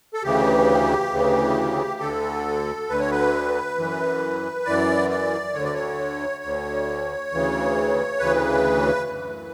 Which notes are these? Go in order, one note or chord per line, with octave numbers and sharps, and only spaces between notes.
A4
D2 C#3 E3 G4
D2 C#3 E3
D2 D3 A4
D2 D3 B4
C#5
B4
F#2 E3
F#2 E3 D5
D5
D2 D3 C#5
D5
C#5
D2 D3
D2 C#3 E3
D2 C#3 E3 B4
F#2 E3